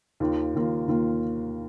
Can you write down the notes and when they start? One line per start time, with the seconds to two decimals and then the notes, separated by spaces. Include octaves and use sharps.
0.20 D#2 D#3 A#3 F4
0.54 D#2 D#3 A#3 F4
0.88 D#2 D#3 A#3 F4